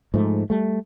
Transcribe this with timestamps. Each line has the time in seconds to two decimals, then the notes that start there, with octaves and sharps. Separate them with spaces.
0.14 G#2 F3 A3
0.50 G3 A3